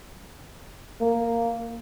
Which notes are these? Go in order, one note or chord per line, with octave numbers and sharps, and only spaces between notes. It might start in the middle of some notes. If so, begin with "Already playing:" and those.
A#3